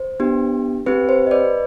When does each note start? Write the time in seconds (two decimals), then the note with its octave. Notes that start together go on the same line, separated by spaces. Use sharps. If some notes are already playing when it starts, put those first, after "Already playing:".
Already playing: C5
0.20 B3 D4 G4
0.86 C4 G4 B4
1.09 C5
1.27 D#5
1.31 B4 D5